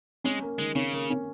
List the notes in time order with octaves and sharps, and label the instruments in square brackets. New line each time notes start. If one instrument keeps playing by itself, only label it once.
[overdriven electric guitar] G#3 [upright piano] C#4
[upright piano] A#3
[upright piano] D#3 [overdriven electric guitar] G#3
[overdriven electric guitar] C#3 [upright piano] C#4
[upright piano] A#3
C#4